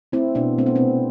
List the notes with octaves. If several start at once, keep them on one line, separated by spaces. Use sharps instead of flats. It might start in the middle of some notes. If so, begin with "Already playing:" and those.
A3 C4 E4
B2 B3 D4
A3 C4
B3
C4
C3